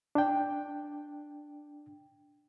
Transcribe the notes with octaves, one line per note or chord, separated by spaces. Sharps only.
D4 G5